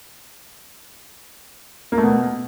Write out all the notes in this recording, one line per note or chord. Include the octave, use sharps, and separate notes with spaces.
A#3
A3
B2